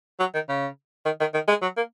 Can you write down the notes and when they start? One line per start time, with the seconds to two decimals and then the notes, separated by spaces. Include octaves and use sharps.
0.19 F#3
0.34 D#3
0.49 C#3
1.05 D#3
1.20 D#3
1.34 D#3
1.48 G#3
1.62 F#3
1.77 A#3